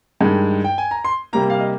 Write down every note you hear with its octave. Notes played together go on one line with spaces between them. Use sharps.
G2 D#3 G#3
G5
G#5
A#5
C6
C3 G3 A#3 A#5
F5
D#5